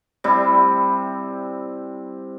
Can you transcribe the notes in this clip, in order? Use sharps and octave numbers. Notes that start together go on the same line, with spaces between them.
C3 G3 E4